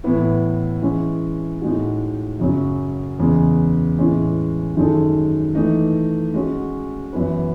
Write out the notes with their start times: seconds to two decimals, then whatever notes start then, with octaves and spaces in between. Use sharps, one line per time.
0.04 A2 E3 B3 E4
0.82 E3 G#3 C#4 E4
1.61 A2 G#3 D#4 F#4
2.40 F#2 C#3 F#3 C#4
3.19 E2 C#3 G#3
3.98 A2 E3 G#3 C#4
4.76 F#2 D#3 G#3 D#4 A4
5.55 E3 A3 D#4
6.34 G#3 C#4 F#4
7.13 F#2 E3 B3 E4 B4